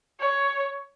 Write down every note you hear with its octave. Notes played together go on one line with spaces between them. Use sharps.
C#5